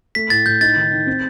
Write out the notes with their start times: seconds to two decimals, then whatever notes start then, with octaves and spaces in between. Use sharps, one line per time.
0.15 A3 B6
0.30 A2 A6
0.46 A2 G6
0.61 D#4 A6
0.76 D#3
0.91 D#3
1.07 C4